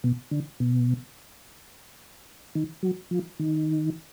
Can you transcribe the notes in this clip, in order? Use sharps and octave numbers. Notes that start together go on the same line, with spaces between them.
B2
D3
B2
D#3
F#3
F3
D#3